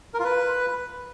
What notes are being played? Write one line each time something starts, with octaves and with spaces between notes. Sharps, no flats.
A#4
F4
B4